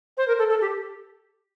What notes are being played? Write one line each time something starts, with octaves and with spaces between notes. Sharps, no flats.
C5
A#4
A4
A4
G4